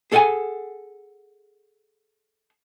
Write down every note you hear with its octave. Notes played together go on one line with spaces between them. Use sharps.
G#4 A4 D5 F5 F#5 G#5